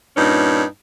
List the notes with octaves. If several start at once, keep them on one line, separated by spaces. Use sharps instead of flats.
G2 A#2 C#4 D#4